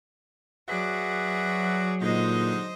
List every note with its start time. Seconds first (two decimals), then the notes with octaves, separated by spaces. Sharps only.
0.68 F#3 F#4 G#4 B4 D5 E5
2.02 A#2 D3 G#3 D#4 C5 D#5